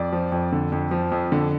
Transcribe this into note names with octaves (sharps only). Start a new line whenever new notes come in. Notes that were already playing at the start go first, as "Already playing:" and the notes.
Already playing: F2 D5
F3
F2
D3
F2
F3
F2
D3